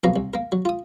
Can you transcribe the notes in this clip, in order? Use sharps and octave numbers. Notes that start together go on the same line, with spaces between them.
C2 F2 F#3 B3 F5 A#5
C2
A#3 A#4
F#3
F4 D#6